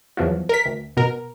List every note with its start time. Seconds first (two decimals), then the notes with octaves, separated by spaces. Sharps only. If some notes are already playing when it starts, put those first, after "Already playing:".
0.17 E2 F3 F#3
0.49 A#4 B6
0.65 D2
0.97 B2 A#4